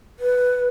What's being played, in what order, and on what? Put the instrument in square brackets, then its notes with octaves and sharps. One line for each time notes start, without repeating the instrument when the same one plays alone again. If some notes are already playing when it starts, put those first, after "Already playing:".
[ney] B4